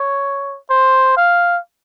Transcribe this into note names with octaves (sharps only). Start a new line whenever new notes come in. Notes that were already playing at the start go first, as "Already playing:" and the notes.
Already playing: C#5
C5
F5